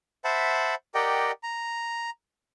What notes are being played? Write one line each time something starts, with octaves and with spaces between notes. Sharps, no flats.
C5 E5 F#5 A5 B5
G4 A#4 D5 D#5 F#5 G5
A#5